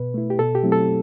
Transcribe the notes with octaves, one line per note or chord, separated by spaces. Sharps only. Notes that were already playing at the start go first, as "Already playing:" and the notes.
Already playing: B2 B4
A3 E4
G4
B2 A4
G4
F#3 A3 C4 E4
A4